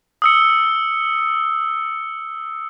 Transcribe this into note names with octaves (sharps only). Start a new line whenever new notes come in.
D#6 E6 C#7